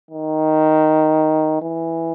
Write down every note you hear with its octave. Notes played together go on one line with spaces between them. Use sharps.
D#3
E3